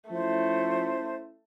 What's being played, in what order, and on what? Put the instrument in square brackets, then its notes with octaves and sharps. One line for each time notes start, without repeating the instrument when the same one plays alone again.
[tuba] F3 [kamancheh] A3 [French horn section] C#4 E4 [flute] C5